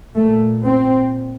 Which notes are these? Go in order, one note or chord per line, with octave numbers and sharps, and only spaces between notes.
A#2 A3
C4